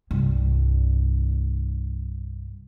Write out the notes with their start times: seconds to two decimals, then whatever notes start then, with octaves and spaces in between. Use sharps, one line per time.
0.11 C2 G2